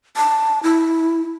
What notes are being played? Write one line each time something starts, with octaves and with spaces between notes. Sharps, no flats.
A5
E4